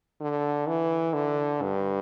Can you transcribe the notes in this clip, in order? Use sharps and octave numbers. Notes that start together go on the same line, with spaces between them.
D3
E3
D3
G2